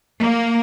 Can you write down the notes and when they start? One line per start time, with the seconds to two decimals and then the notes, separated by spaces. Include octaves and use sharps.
0.20 A#3